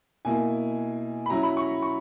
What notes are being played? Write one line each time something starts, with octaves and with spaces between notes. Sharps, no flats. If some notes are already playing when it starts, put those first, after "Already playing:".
B2 A#3 E4 G#5
B5
F#3 C#4 E4 A#5
B5
C#6
C#6